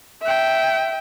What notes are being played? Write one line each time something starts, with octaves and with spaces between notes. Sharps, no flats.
E5 G5